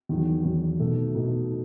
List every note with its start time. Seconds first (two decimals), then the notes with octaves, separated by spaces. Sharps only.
0.09 E2 D#3 F#3
0.44 E2 D#3 F#3
0.80 B2 A3 D#4
1.15 B2 A3 D#4